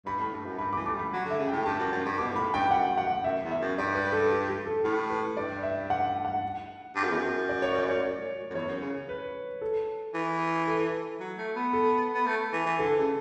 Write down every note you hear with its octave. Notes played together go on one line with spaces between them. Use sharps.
G2 B5
A2
G2
F#2
G2 B5
E3 D6
A3 D6
G3
B5
F#3
D3
E5
C#3
A2 G5
G2 A5
F#2
F#2
G2
B2 D6
G2
A2 B5
G2 G5
F#2 F#5
F#5
F#2 E5
E2
E5
F#2
G2 D5
B4
A4
G4
G4
A4
A2 A4
B4
G2 D5
E5
F#5
F#5
G2
F#2
E2
F#2
D5
C#5
D5
C#5
F#2
E2 C#5
F#2
C#3
B4
A4
E3
A4
F#3
A3
B3
A4
B3
A3
E3
E3
D3 A4
C#3